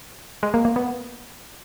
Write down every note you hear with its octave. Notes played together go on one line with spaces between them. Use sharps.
G#3
A#3
A#3
B3